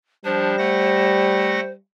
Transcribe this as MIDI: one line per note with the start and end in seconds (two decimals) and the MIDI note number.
0.25 0.56 53
0.25 1.78 55
0.25 0.56 62
0.25 1.71 72
0.58 1.60 57
0.58 1.60 78
0.58 1.60 94